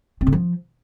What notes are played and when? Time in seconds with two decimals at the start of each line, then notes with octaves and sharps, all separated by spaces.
0.21 C4
0.27 D3
0.32 F3